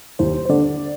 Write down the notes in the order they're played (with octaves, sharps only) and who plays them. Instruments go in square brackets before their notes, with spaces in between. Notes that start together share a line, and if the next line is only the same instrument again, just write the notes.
[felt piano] D#2 [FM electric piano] C5
[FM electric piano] C5
[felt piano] D3 [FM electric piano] D5